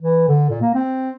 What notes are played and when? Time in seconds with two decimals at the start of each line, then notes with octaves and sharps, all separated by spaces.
0.01 E3
0.29 D3
0.50 A#2
0.61 A#3
0.75 C4